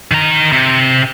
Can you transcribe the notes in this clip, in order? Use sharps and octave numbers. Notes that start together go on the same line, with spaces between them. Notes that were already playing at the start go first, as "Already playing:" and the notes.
D#3 A#5
C3